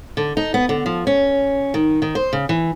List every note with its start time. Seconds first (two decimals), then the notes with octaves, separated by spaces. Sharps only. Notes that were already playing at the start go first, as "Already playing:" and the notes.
0.17 D3
0.37 D#4
0.54 B3
0.69 D3
0.86 F3
1.07 C#4
1.74 D#3
2.02 D#3
2.15 C5
2.33 C#3
2.49 E3